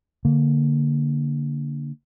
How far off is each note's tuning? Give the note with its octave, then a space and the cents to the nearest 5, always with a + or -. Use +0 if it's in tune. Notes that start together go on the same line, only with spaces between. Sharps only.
D3 -15 A#3 -5